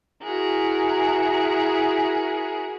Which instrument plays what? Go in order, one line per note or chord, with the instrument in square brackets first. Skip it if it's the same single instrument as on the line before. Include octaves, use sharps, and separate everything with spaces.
[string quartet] E4 F#4 G#4 A#4